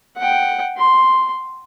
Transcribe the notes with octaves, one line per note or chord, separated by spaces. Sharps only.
F#5 G5
C6